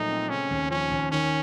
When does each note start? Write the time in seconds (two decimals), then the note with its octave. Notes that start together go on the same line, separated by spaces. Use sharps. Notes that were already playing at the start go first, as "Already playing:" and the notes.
Already playing: A#2 F3 F#3 A3 D#4
0.10 C4
0.30 C#3 C#4
0.51 D#2
0.71 F3 C#4
0.91 D#2
1.12 D#3 C#4